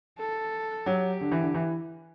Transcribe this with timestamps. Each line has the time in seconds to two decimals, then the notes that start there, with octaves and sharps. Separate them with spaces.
0.19 A4
0.86 F#3 G4
1.21 D3
1.32 E3
1.42 D3
1.54 E3